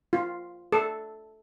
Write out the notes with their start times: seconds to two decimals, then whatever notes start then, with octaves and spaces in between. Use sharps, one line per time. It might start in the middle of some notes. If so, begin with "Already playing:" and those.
0.13 F4
0.72 A4